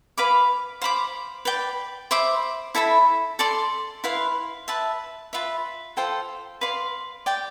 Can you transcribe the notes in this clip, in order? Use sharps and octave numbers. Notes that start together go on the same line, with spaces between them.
B4 F5 B5 D6
C5 F5 B5 D6
B4 D5 G5
C5 E5 B5 D6
E4 A4 E5 B5
A4 D5 A5 C6
E4 B4 F5 C6
B4 E5 A5
F4 B4 E5
F4 A4 C5 G5
B4 D5 F5 C6
G4 D5 G5